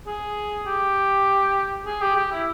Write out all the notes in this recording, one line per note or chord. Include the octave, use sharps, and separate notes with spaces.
G#4
G4
G#4
G4
G4
E4